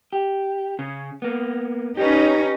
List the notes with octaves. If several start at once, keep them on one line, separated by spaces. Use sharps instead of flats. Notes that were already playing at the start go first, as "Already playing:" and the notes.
G4
C#3
A#3 B3
C#4 D#4 G4 B4